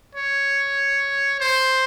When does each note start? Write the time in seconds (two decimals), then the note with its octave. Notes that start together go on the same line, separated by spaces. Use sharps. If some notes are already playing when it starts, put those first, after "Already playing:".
0.16 C#5
1.41 C5